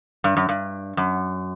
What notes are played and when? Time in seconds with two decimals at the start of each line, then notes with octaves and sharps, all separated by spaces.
0.24 G2
0.37 F#2
0.49 G2
0.97 F#2